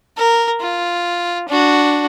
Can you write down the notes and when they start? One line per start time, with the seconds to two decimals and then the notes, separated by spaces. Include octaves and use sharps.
0.17 A#4
0.60 F4
1.48 D4 F#4